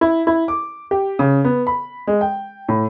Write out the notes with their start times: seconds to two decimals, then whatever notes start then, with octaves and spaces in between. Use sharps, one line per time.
0.01 E4
0.27 E4
0.48 D6
0.91 G4
1.19 C#3
1.44 B3
1.67 B5
2.07 G#3
2.21 G5
2.69 A2